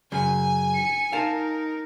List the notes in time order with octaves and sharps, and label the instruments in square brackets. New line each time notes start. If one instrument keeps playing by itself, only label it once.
[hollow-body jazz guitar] F#2 C#3 [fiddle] G#5
[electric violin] C#7
[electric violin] D#4 A#4 [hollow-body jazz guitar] F5 A5